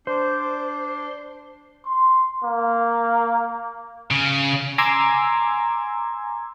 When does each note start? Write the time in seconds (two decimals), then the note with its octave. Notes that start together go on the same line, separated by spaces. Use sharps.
0.07 D4 C5
1.85 C6
2.44 A#3
4.11 C#3
4.78 G#5 A#5 C6 D6 E6 G#6